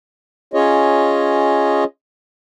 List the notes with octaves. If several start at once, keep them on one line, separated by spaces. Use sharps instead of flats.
C#4 F4 G#4 C#5 D#5